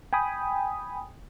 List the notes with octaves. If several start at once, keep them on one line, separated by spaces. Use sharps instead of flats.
G5 G#5 B5 D#6